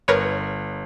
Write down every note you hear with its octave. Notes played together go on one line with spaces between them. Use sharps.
G1 A#4 B4 C#5